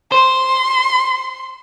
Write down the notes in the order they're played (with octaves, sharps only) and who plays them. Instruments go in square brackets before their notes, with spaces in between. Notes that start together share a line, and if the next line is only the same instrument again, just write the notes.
[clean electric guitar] C5 [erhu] C6